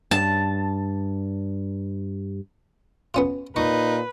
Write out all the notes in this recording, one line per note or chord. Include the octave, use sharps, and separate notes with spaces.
G2 A5
B3 C#4 F4
A#2 D#4 B4 C#6